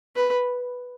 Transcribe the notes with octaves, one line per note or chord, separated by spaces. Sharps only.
B4